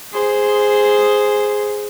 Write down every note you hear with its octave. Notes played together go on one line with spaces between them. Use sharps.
G#4 C5